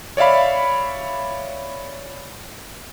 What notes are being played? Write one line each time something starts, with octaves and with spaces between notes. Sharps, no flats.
C#5 D5 E5 F5 B5